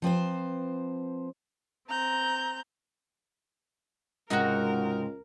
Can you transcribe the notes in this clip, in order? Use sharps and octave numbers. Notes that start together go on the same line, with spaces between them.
F3 C4 B4 C5
C4 A#5 G6
C#2 G#2 C3 G#3 D#4 F#4 A#4